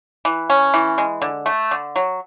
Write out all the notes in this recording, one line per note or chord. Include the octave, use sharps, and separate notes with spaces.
E3
C#4
E3
G#3
D3
A3
D3
F#3